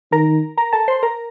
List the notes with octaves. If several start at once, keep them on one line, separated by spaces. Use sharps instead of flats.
D#3 A#4 A#5
A#4 A#5
A4 A5
C5 C6
A#4 A#5